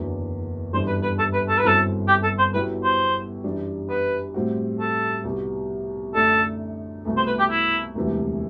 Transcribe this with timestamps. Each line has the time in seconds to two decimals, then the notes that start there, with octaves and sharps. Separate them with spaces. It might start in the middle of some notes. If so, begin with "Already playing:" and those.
Already playing: F#1 E2 D3 F#3
0.73 G1 F#2 E3 G3 D4 C5
0.88 B4
1.03 B4
1.19 A4
1.33 B4
1.49 A4
1.58 B4
1.63 G1 F#2 F#3 C4 E4 A4
2.08 G4
2.23 A4
2.38 C5
2.54 B2 F#3 B3 E4 G4 B4
2.84 C5
3.44 F#2 E3 G3 D4
3.90 B4
4.34 A2 G3 C4 F#4
4.80 A4
5.24 C2 B2 G3
6.15 F#2 D3 A3 D4 A4
7.05 C2 B2 A3
7.17 C5
7.27 B4
7.39 G4
7.51 E4
7.95 E1 D2 C3 E3 G3